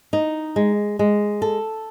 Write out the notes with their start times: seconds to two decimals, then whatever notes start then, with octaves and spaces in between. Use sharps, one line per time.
0.13 D#4
0.56 G#3
0.99 G#3
1.42 A4